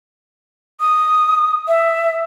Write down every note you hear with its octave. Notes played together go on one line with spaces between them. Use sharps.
D#6
E5